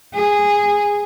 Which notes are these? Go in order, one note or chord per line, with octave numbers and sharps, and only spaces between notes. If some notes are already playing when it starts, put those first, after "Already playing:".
G#4